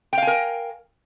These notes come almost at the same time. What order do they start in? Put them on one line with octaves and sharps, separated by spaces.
G5 F5 G#5 A#4